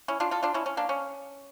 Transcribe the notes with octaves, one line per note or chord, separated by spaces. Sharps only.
C#4 E4
D4 F4
F4 A4
D4 F4
C#4 E4
C#4
A#3 D4
C#4